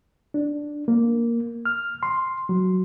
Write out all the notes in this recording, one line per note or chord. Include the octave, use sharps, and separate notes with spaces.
D4
A#3
F6
C6
F#3